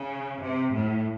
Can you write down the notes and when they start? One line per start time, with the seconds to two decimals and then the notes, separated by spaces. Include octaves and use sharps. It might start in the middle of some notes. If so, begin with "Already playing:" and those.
Already playing: C#3
0.41 C3
0.73 A2